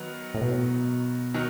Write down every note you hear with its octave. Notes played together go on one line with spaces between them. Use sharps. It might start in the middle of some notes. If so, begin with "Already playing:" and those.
Already playing: D#3 F#3 B3
A2
B2
D#3 F#3